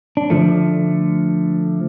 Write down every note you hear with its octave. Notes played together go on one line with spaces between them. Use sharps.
D4
D3 F3 A3